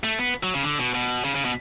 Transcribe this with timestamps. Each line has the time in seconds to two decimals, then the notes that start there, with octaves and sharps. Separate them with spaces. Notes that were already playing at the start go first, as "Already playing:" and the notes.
0.04 A3
0.19 B3
0.43 F#3
0.54 C#3
0.63 D3
0.79 B2
0.94 B2
1.24 C#3
1.35 C#3
1.45 B2